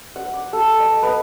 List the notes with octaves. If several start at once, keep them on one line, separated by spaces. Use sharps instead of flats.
F#5
D6
A4
D#5
B3